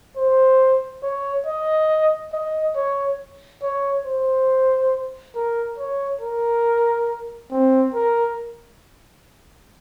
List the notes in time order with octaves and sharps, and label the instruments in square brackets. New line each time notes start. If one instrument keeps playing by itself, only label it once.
[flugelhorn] C5
C#5
D#5
D#5
C#5
C#5
C5
A#4
C#5
A#4
C4
A#4